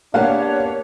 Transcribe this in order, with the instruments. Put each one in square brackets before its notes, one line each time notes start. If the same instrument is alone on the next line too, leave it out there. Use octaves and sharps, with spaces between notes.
[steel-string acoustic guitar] A#3 B3 G4 [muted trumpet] D4 [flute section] C#5 [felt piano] F5 F#5